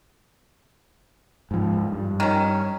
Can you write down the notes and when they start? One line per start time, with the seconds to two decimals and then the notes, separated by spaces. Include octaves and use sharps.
1.51 G#2 F3
1.92 G2
2.20 D#3 C#4